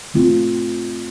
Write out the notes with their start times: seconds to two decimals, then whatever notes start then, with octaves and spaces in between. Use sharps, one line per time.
0.14 F3 A3 C4 F4